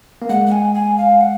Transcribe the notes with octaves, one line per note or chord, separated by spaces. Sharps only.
A#3
G#3 F#5
F#5
G#5
G#5
F5
F#5